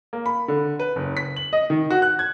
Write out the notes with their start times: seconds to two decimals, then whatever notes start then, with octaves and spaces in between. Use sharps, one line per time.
0.13 A#3
0.26 B5
0.48 D3
0.79 B4
0.96 F#1
1.17 B6
1.36 F#7
1.53 D#5
1.70 D#3
1.90 F#4
2.02 F#6
2.19 G#6